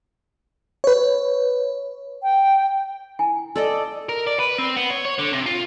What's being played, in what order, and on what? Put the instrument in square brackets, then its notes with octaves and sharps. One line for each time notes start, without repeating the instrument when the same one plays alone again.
[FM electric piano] B4 C#5
[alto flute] G5
[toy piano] E4 G#5 A#5
[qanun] A4 D5 D#5
[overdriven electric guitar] A#4
D5
B4
C4
B3
C#5
C#5
D3
C3
F4